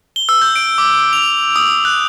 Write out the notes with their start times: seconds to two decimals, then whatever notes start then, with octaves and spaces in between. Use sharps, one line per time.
0.16 G7
0.29 E6
0.42 G6
0.56 D7
0.78 D6
1.13 F7
1.56 D#6
1.85 F#6